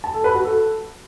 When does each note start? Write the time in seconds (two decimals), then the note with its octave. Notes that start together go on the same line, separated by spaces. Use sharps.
0.04 A5
0.14 A4
0.24 B4
0.34 F#4
0.45 A4